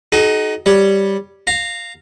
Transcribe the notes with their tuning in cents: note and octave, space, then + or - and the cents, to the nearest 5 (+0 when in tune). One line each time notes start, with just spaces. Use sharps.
D#4 +0 F#4 +35 A4 -45
G3 +0 C#5 +5
F5 +0 A#5 -15